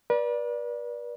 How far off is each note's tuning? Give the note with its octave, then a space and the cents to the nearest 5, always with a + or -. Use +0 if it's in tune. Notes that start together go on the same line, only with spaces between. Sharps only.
B4 -40 D5 +0